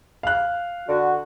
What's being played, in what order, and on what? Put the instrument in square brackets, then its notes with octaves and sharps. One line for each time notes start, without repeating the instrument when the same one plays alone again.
[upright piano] F5 F#6
[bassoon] D3 [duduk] F#4